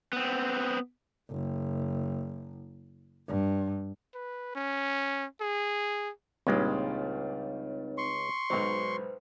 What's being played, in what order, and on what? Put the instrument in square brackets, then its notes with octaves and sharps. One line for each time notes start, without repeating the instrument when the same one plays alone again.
[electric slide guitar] B3 C4
[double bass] F#1
G2
[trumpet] B4
C#4
G#4
[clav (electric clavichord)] C#2 G#3 [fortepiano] G2 A#2 G3 [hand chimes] C4 D#4 C#5
[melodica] C6 C#6
[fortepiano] B1 G#2 D#4 [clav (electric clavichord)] F#3 [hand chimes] B4 C5